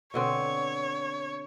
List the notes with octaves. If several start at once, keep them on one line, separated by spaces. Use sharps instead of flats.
B2 D3 C4 C#5